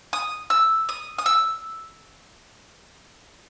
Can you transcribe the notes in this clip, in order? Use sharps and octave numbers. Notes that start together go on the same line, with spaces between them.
D#6
E6
D#6
D#6
E6